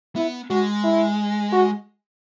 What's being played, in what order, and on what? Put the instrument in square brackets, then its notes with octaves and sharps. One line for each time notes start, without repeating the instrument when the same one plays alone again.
[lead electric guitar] B3 [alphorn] E4
[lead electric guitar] G#3 [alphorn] F#4
[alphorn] E4
F#4